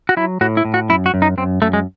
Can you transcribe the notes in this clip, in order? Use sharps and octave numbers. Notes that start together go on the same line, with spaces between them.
F#4
F#3 E4
A2 F#4
E4
A2
F#4
F#2 E4
F#4
F#2
D#4
F#2 C4
F#2 A3
G#3